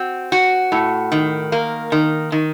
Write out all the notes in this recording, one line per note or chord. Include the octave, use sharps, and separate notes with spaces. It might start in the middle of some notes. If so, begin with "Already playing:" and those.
Already playing: C4 F#4
F#4
A2
D#3
A#3
D#3
D#3